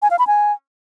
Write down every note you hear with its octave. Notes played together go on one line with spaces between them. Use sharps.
G#5
F5
B5
G#5